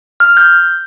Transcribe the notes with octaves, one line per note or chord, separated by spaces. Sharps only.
F6
G6